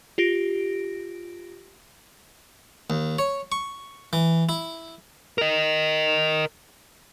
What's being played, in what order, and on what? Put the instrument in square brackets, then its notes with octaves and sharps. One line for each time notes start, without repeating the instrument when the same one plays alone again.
[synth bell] F4 G4 A#6 D7
[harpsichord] D#2
C#5
C#6
E3
E4
[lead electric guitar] A#4 D#5